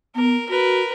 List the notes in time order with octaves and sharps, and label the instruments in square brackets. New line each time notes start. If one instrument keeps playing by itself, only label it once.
[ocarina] B3 [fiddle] A#4
[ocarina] F#4 [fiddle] A#4 B4